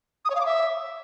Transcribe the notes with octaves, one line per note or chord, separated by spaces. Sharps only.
D#6
C#5
F5
D6
E5